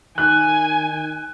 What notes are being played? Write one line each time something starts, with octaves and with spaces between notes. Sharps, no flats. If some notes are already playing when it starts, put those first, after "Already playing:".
D#3 G#5 F#6